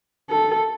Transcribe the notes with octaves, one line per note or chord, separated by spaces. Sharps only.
A4